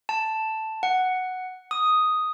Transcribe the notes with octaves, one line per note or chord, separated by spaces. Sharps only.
A5
F#5
D#6